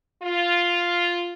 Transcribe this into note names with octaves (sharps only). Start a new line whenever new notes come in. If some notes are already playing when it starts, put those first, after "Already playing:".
F4